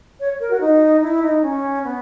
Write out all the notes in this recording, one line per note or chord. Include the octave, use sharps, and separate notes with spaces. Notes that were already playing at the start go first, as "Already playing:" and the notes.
C#5
A#4
F#4
D#4
E4
D#4
C#4
B3